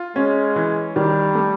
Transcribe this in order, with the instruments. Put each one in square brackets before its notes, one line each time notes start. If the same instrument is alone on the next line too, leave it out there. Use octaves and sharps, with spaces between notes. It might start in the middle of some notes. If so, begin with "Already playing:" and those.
Already playing: [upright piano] F4
[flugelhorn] G#3 [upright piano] C#4
[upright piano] E3
[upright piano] D#3 [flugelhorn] G3
[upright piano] A3